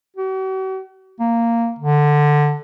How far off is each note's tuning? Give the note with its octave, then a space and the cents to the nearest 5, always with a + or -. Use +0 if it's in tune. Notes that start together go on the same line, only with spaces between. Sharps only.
F#4 +45
A#3 -10
D3 +10